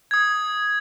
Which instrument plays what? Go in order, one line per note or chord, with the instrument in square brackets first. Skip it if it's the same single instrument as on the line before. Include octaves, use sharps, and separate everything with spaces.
[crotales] D#6 G#6